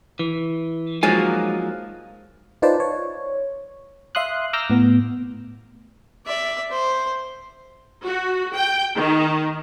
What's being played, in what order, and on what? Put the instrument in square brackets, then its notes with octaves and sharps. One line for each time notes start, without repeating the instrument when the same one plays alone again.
[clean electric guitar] E3
[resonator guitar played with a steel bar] F3 F#3 A#3 [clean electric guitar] G#3 D#4 G#5
[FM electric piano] D#4 F4 B4 C5 D5 A5
C#5
E5 F5 C6 D#6 F#6
A#5 D6 E6 F6 G6 A#6
A2 B3
[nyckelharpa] D5 E5
C5
[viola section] F#4
G5
D#3